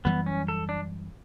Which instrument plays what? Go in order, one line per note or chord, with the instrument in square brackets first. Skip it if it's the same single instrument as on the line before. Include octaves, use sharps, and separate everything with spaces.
[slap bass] F#2 E3 G3 [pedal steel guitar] B3
[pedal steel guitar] C#4
A4
D4